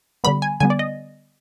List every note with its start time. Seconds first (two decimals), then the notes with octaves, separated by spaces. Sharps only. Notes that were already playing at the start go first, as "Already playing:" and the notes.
0.24 D3 G3 B3 B5
0.42 G#5
0.60 D3 G3 B3 G#5
0.70 D5
0.79 D#5